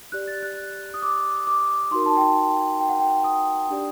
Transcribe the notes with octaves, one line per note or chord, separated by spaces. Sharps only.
G4 D5 F#6
A6
F#6
D#6
D6
D6
D#4 F#4 A#4 C6
A5
G5
A5
G5
F#5
G5
D#6
D4 G4 D5